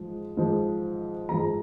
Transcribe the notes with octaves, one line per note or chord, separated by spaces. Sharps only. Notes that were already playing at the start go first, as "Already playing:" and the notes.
Already playing: G#2 F3 G#3
G#2 F3 G#3
G#2 F3 G#3 A#5